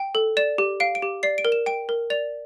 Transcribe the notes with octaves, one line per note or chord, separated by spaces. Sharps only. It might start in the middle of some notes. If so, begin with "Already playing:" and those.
Already playing: G5
A4
D5 E7
G4
F5 D7
D7
G4
D5 C7
D7
A#4
E7
G5 D7
A#4
D5 F7